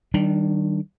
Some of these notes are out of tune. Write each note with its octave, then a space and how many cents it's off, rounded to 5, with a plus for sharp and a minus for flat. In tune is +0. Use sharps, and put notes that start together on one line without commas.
D#3 +0 G3 -25 D4 +20